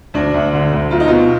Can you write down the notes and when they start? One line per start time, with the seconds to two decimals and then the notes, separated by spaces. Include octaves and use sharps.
0.14 D2 D4
0.34 D2
0.53 D3
0.73 D2
0.91 B1 F4
1.00 D#4
1.08 B2 F4